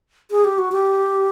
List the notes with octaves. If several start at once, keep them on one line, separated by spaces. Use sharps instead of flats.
G#4
G4
F#4
G4